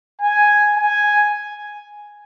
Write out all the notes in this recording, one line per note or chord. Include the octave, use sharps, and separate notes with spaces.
G#5
G#5